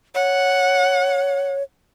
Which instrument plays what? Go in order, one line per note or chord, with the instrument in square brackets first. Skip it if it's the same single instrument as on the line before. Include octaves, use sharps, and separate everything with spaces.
[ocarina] C#5 [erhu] F#5